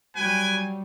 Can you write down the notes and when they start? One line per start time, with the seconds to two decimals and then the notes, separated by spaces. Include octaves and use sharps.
0.16 F#3 G3 B4 G5 G#5